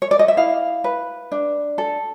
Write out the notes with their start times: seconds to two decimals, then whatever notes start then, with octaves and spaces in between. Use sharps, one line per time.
0.02 C#5
0.11 D5
0.19 D#5
0.28 E5
0.37 E4 F5
0.84 B4
1.32 D4
1.78 A4